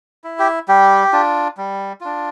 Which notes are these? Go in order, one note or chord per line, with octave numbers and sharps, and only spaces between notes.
E4
G4
G3 G4
D4 F4
G3
D4 F4